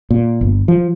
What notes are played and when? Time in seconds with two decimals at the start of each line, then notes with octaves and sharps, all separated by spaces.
0.11 A#2
0.41 G1
0.68 F3